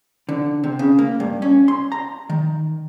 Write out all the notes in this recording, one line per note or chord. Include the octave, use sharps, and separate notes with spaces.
D3
C3
C#3
A#3
G2
C#4
C6
A#5
D#3